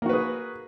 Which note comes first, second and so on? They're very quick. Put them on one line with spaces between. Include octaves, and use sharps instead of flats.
A#3 F#4 B4 G#4